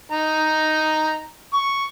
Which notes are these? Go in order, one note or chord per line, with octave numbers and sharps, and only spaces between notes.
D#4 A#5
C#6